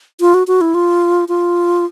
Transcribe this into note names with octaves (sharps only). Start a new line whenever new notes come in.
F4
F#4
F#4
E4
F4
F4